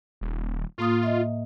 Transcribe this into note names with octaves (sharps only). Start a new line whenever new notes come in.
D#1
A2 A#3 F4 D#6
D#5 E5